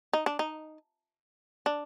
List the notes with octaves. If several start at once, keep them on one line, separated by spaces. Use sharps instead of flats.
D#4
D4
D#4
D4